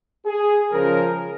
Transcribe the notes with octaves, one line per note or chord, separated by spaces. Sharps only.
G#4
C#3 F3 G#3 A#4